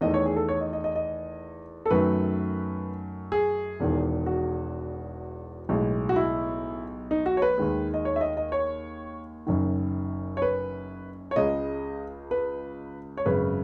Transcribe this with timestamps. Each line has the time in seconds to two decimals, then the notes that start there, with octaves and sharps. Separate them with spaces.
0.01 E2 D#3 A3 D#5
0.14 C#5
0.26 G#4
0.36 A4
0.48 C#5
0.61 D#5
0.73 D#5
0.84 D#5
0.96 D#5
1.86 A4
1.91 F#2 D#3 F#3 A3 B4
3.32 G#4
3.80 E1 E2 D#3
4.26 F#4
5.69 B1 A2 G#3
6.09 F#4
6.16 E4
7.11 D#4
7.26 F#4
7.37 C#5
7.42 B4
7.58 D#2 D#3 G#3
7.94 D#5
8.05 C#5
8.16 E5
8.21 D#5
8.37 D#5
8.52 C#5
9.47 F#1 F#2 D#3
10.37 C#5
10.42 B4
11.31 C#5
11.36 C#2 C#3 G#3 D#5
12.31 B4
13.17 C#5
13.26 G#1 F#2 C#3 B4